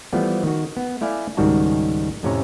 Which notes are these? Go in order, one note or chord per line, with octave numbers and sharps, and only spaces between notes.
E3 F3 G3 A3 B3
D#3 F#4
B3
A3 E4 D5 F5 G#5
C#2 G#2 D#3 G3 F#4 A5
F2 A2 C3 C#4 C#5 A#5